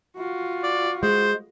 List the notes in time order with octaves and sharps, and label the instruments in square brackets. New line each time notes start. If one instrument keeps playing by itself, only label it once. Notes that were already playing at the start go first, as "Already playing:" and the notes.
[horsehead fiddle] F4 F#4
[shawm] D5
[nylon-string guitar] G#3 [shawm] C5